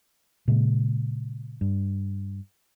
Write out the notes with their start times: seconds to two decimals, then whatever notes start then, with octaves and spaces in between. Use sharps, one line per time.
0.48 A#2 C#3 G#3
1.61 G2